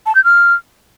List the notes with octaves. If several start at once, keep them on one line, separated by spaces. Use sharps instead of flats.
A5
G6
F6